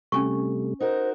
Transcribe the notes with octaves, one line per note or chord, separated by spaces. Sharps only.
C3 G3 A3 C#4 G#5 C#6
D#4 F#4 A#4 C5